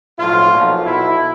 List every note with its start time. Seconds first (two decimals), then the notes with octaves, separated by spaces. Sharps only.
0.18 B1 A2 F3 F4
0.52 B1 A#2 F3
0.85 B1 B2 E4